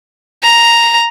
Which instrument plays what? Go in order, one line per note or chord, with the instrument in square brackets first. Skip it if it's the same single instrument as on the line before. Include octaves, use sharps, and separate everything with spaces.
[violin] A#5